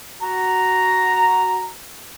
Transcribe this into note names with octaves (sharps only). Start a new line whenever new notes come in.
F#4 A#5